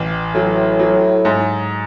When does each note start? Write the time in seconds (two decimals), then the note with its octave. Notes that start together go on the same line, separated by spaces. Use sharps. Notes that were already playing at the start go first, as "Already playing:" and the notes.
Already playing: A1
0.35 A2 F#3
0.79 F#3
1.25 G#2